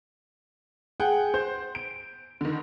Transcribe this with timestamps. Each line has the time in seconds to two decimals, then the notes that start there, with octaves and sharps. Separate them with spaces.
1.00 G#4 F#5 G5
1.34 C5 G6
1.75 D7
2.41 D3 D#3